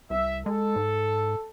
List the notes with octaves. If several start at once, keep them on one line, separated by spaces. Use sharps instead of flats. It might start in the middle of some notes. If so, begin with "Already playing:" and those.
C2 E5
G#3 A4
G#2